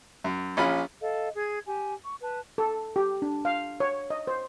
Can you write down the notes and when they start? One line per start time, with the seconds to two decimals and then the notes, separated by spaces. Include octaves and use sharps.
0.24 F#2
0.57 A#1 C#4 F4 B5
1.02 A4 D#5 F5
1.35 G#4 G#6
1.66 G4 G#5
2.04 C#6
2.22 B4 A5
2.58 A4
2.96 G4
3.22 D4
3.45 F5
3.80 C#5
4.10 D#5
4.27 C5